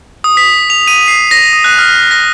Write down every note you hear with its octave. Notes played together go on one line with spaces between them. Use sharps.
D#6
B6
F7
D#7
C7
A#6
D#6
F#6
F6
A#6